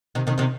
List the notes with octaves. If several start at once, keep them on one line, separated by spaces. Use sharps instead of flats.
C3 D#3
C3 D#3
C3 D#3